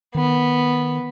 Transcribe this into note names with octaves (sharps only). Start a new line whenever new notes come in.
D#3 B3